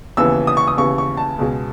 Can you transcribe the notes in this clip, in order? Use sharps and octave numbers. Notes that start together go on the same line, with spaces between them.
D#2 C#3 E3 B3 E6
D#6
C#6
D#6
D#2 C#3 E3 B3 C#6
C#6
A5
C#2 B2 G#3